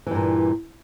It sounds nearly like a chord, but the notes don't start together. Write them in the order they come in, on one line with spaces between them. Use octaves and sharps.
E3 G2 A#2